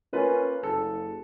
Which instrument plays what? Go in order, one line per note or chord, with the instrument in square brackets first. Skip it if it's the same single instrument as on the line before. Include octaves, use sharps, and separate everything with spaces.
[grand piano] A#3 F4 B4 [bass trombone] C#4
[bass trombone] F#1 [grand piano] A4